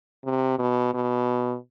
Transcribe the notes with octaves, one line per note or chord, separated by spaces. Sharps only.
C3
B2
B2